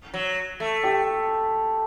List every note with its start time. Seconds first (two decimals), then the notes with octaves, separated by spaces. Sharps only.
0.14 F#3
0.60 A3
0.84 G4